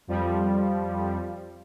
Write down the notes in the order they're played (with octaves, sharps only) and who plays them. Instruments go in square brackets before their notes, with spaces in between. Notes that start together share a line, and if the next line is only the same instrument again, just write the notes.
[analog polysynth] F2 F3 G3